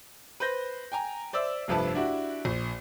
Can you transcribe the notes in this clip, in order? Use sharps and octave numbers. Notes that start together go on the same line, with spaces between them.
B4 C5 G6 A#6
G5 G#5 A#5
C5 D5 E5 E6
F1 G2 F3 B4 E5 A5
D4 E4 F#4 G4
A#1